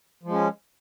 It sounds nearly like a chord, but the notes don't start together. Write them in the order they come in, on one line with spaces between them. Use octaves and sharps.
F3 G#3 C#4